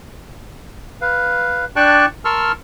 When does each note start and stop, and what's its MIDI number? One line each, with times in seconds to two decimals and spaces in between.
1.01 1.65 71
1.01 1.65 77
1.76 2.06 62
1.76 2.06 74
1.76 2.06 79
1.76 2.06 81
1.76 2.06 85
1.76 2.06 90
2.25 2.52 70
2.25 2.52 81
2.25 2.52 84
2.25 2.52 85
2.25 2.52 88
2.25 2.52 89